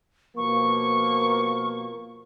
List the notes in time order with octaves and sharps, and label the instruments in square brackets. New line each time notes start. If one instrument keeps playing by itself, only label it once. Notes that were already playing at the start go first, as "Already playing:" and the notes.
[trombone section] B2 F3 A#3 [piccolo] C#6